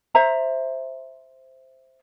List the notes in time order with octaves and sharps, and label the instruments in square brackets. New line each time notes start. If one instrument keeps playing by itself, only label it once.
[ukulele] C5 E5 A#5